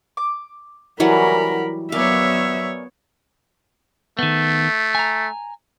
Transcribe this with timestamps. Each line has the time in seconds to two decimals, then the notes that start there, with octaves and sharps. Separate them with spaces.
0.17 D6
1.00 E3 F#3 G3 A#4 C#5 F#5 G#5 B5
1.92 F#3 B3 C#4 A#4 C#5 D5 E5 F5
4.19 D#3 A3 B3
4.95 G#5 A#5